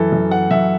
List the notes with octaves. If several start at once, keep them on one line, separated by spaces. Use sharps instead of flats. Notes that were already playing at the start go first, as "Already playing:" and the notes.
Already playing: F#2 E3 A4
F#2
E3 F#5
F#2 E5